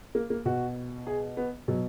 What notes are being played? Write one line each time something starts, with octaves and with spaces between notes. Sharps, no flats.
A#3
A#3
B2 F#4
G#4
B3
B2 F#3